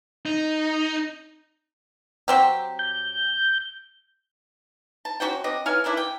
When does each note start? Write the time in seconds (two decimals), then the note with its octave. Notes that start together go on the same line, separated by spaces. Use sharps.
0.26 D#4
2.28 F#3 C4 G4
2.79 G6
5.05 A5
5.20 C#4 F#4 C5 G5
5.44 C4 D4 D#5
5.66 E3 C#5 F5 G#5
5.84 E3 A#3 D4 E4
5.97 G5